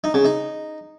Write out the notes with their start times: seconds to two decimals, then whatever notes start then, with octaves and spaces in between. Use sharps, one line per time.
0.04 D#4
0.14 C#3
0.25 D#4